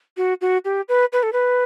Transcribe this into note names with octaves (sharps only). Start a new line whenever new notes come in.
F#4
F#4
G4
B4
B4
A4
B4